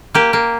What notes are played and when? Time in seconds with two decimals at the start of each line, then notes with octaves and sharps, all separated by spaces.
0.14 A#3 G4
0.33 A#3